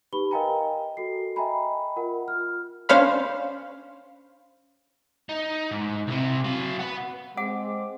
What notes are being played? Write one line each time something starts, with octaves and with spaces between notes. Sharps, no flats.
D#4 G4 B4 B5 G7
A#4 D#5 F5 G5 G#5 A#5
F#4 A4 C7
D#5 E5 G5 G#5 A#5 B5
F4 A#4 F#5
F4 F6
C#4 D4 C5 C#5 F5 B5
D#4
G#2
C2 C3
F#3 F5
B4 F#5
G#3 C4 F#5 D6